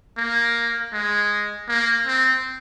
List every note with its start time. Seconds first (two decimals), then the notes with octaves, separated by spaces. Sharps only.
0.17 A#3
0.93 G#3
1.69 A#3
2.06 C4